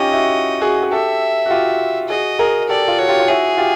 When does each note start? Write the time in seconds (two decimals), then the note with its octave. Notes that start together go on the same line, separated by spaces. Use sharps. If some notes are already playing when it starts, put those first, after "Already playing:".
Already playing: C#4 D#4 F4 G4 D#5
0.12 E4 F#4
0.61 F#4 G#4
0.83 G#4
0.91 G4 A4 E5
1.46 F#4
1.50 F4 G4
2.09 F#4 G#4 D#5
2.39 G#4 A#4
2.69 G4 A4 D5
2.88 F4
2.99 F#4 C#5
3.08 F4 G4
3.19 F4
3.28 E4 F#4 G#4
3.57 F4 G4